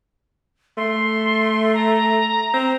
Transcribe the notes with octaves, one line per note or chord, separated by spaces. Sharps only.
A3 C6
A#5
C4